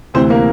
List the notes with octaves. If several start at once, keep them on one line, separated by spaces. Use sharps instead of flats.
D2 C3 E3 C4 C5
A#3 A#4